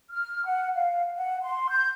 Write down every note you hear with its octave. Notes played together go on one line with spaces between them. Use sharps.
F6
F#5
F5
F#5
C6
G6